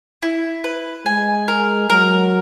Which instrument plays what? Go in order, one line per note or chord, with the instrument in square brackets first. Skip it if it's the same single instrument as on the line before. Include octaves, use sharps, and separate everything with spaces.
[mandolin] E4
B4
[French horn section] G#3 [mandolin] G#5
[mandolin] A#4
[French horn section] F#3 [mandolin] A#4